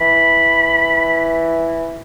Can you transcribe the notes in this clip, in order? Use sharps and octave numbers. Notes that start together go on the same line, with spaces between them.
E3 B5